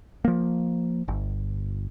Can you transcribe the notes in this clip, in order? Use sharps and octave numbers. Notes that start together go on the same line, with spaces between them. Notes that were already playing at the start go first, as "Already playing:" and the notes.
F3 A#3
G1